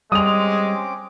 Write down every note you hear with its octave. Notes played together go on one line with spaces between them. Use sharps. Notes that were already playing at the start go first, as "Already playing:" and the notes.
G3 G#3 C4 C#4 D6 D#6 F7